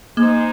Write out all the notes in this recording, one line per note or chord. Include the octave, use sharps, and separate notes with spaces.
G#3 A#3 D#4 G#4 C5